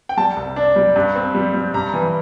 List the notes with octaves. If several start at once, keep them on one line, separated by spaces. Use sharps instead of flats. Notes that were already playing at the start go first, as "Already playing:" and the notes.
G5
G3 A5
C2
D4
G3
G2
C4
G3
G3
G2 A#5
E3